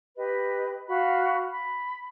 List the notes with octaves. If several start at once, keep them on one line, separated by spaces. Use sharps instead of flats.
G4 B4 D#5
F#4 F5 B5
B5